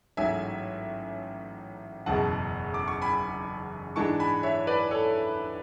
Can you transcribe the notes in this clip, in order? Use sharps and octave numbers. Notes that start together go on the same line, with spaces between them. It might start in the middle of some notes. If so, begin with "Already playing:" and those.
A1 G#2 F#3 E5 G#5
F#1 E2 B2 G#3 F#5 A5
D6
C#6
G#5 B5
G#2 E3 G#3 D4 A5 C#6
G#5 B5
C#5 E5
B4 D5
A4 C#5